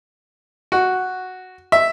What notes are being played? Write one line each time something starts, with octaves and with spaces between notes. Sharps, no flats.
F#4
E5